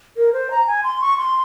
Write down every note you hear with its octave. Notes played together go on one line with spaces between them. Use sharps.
A#4
C5
A#5
G#5
C6
C#6
C6